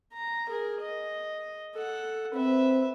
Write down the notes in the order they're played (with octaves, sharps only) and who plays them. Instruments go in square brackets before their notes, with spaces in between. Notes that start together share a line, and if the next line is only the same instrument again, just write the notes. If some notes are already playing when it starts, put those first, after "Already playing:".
[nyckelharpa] A#5
G#4 A#4
D#5
A4 F#5
[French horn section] C4 [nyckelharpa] B4 E5